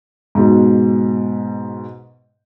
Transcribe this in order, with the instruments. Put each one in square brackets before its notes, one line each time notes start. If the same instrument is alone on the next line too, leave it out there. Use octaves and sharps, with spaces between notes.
[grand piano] G#2 B2